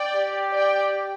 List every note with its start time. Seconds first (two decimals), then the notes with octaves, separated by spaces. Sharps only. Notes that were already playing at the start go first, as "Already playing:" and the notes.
Already playing: D5 G5
0.16 G4
0.54 D5 G5